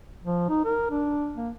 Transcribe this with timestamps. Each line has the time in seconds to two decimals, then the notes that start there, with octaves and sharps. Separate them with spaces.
0.23 F3
0.49 D#4
0.65 A#4
0.90 D4
1.36 A#3